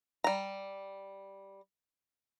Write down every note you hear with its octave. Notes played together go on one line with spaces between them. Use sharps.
G3 A#5